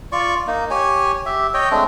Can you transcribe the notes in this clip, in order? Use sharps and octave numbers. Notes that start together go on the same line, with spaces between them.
F4 D5 C#6
A#3 D#4
G4 C#5 G#5
G4 E5
C#5 D#5 G5
G#3 A3 C4 D4